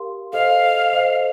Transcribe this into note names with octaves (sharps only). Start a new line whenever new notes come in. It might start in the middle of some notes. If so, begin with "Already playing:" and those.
Already playing: G4 A#4 F5 C6
A4 C5 D#5 F5
A4 C5 D#5